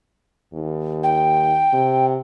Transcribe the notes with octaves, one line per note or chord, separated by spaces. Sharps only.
D#2
G5
C3